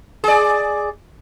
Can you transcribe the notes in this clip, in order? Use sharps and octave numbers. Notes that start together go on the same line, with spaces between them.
G#4 D5